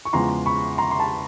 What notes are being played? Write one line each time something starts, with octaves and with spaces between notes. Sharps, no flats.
C#6
E2 C#3 F3 G#3 A#5 C6
B5 C#6
A#5 C6
C6
A5 B5